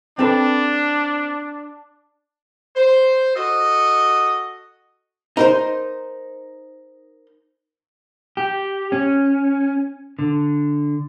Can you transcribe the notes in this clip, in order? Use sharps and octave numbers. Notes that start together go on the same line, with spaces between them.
C4 D4 A4 B4
C5
F#4 A4 D#5
D#4 A#4 C5
G4
C#4
D3